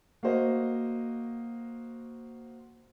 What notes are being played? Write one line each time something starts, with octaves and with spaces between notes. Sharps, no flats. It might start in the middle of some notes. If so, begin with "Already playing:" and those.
A#3 F#4 C5 D#5